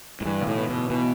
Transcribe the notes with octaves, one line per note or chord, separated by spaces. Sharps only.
A2
G2 E3
B1
A2
B3
B2
A2
B2 E3